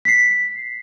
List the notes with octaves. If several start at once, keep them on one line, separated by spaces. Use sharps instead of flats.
B6 C7